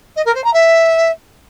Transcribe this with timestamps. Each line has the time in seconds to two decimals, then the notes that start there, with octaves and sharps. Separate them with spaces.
0.16 D#5
0.25 A#4
0.34 C5
0.44 A#5
0.53 E5